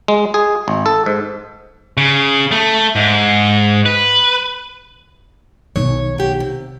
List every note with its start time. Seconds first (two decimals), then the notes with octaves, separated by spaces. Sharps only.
0.08 G#3
0.34 G#4
0.68 G#1
0.86 A4
1.06 G#2
1.97 C#3
2.51 A3
2.96 G#2
3.86 B4
5.76 B1 D#3 C#5
6.18 F#3 G4
6.40 C3